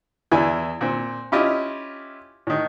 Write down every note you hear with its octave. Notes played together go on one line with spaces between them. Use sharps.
E2 E3 E4 D5 G#5
A#2 C4
C#4 E4 F4 G4 D#5
A2 D#3